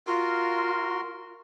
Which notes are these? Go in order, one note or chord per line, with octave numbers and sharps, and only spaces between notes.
F4 F#4 A#4 C6